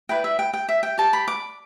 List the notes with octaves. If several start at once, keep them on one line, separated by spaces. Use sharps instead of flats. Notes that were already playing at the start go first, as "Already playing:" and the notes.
E4 B4 D5 G5
E5
G5
G5
E5
G5
G4 D5 A5
B5
D6